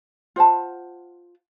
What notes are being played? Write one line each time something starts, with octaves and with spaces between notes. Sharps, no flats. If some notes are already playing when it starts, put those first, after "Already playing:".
F4 C5 F#5 A5